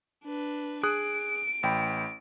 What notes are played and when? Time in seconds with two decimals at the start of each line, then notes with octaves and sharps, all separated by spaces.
0.24 D4 B4
0.83 G#4 D#6 F#6 D7
1.63 A1 G5 B5